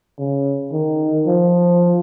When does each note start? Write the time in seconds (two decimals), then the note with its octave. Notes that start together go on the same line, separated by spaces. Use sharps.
0.19 C#3
0.72 D#3
1.26 F3